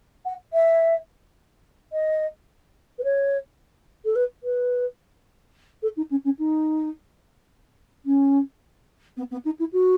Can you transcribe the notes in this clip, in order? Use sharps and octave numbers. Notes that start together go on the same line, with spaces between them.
F#5
E5
D#5
B4
C#5
A4
B4
B4
A4
D#4
C#4
C#4
D#4
C#4
B3
B3
D#4
E4
F#4